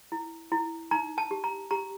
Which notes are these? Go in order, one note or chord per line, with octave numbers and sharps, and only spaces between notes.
E4
E4
D#4 A#5
A5
G4
A#5
G4 A#5